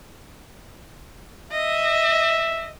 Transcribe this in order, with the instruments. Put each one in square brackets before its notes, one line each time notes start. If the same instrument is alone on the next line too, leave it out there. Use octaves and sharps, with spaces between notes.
[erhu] D#5 [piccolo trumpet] E5